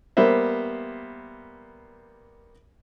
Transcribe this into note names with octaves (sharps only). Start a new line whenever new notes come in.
G3 A#3 B3 C5 E5